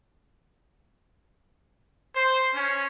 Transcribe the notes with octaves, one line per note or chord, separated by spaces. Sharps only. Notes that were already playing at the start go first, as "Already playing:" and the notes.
C5
C#4